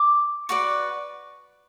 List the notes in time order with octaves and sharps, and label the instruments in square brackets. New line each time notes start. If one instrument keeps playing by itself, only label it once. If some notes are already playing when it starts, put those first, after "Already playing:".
Already playing: [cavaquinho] D6
F#4 B4 D5 C#6